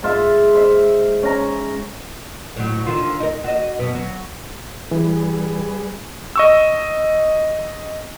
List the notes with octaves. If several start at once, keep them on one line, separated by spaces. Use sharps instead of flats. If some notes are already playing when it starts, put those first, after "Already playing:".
G#2 F4 E5
C5 E5
C#4 A#5
A2 F#3
D3 D#3 F4
D#4 A#4
F#4 D#5
F#2 B2 B3
F#3
E3 G3 G#4 B4
D#5 C#6 E6